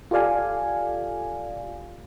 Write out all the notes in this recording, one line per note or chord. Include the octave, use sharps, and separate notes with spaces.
F4 G4 A4 D5 F5 G#5